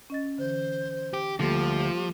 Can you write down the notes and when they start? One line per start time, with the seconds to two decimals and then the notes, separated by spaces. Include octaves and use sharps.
0.10 C#4 D#5 A6
0.38 D3 E3 C5
1.13 G4
1.40 D2 F3 G3 A#3 G4 A4